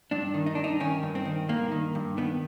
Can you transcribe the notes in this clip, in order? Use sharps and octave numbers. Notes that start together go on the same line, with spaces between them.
G2 D4
D#3
D#4
G2 D4
D#4
D#3 C#4
G2
C4
D#3
G2 A#3
D#3
G2
D#3 B3